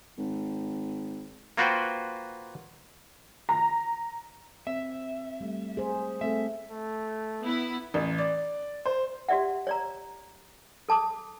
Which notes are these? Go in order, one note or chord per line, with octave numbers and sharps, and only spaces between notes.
G#1
A#3 F4 F#4 B4 C5 G5
A#5
C4 E5
G3 A3
G#4 C5
A3 C4 A4 E5
A3
B3 E4
A1
D5
C5
F#4 G4 D5 E5 F#5
C#5 D5 A#5
A4 A5 D6 D#6